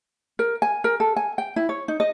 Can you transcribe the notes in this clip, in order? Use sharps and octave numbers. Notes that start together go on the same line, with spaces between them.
A#4
G#5
A#4
A4
G#5
G5
E4
C#5
D#4
D#5